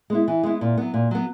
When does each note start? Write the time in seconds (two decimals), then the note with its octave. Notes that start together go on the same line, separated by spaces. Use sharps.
0.10 G#3 B3 E4
0.28 E3
0.43 G#3 B3 E4
0.61 A#2
0.77 F#3 B3
0.94 A#2
1.11 F#3 B3